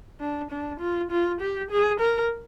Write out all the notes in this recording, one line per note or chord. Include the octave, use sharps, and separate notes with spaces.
D4
D4
F4
F4
G4
G#4
A#4